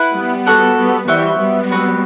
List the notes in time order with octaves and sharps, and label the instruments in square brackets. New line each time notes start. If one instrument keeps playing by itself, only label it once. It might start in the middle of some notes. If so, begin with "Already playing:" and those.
Already playing: [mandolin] E4 B4 F#5
[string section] G3 B3
[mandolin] F#4 A4 D5 F#5
[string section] G3 B3
[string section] E3 G3 [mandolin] F#4 C5 E5 G5
[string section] G3 B3
[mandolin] C4 F#4 B4